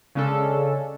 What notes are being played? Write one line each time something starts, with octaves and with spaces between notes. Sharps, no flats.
C#3 G#3 C#4 D4 A4